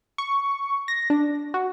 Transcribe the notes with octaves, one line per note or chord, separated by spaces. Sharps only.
C#6
A#6
D4
F#4